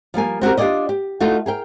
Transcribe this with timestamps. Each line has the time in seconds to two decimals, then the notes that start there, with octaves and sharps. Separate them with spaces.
0.14 F3 G3 A#3 G#5
0.41 C4 F#4 G4 A#4
0.57 D4 F4 G4 G#4 D5 D#5
0.89 G4
1.20 A3 D#4 F4 F#4 A4
1.46 G#4 A#4 G5